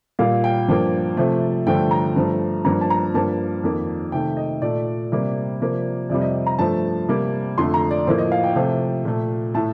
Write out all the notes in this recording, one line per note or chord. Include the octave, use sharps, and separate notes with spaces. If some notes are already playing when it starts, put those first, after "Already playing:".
A#2 G3 A#3 F5
G5
G2 F3 A#3
C3 F3 A3
G2 D3 F3 A3 G5
A#5
G2 F3 A3
G2 F3 A#3 A#5
A5
A#5
G2 F3 A#3 A5
F2 D#3 A#3
C3 D#3 A3 G5
D#5
A#2 A3 D5
C3 G3 A#3
C3 F3 A#3
F2 C3 G3 D5
D#5
A#5
G2 F3 A3 A5
C3 G3 A#3
F2 D3 A3 C6
A#5
D5
A2 F3 A#3 C5
D#5
F5
G5
C3 F3 A3
A#2 A3
A2 A3 A5